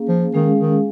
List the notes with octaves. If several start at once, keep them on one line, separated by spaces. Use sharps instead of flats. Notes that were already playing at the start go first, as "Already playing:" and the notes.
Already playing: A#3 C#4 G#4 F5
F3
D#3 G#3 C#4 G#4 F5
D#3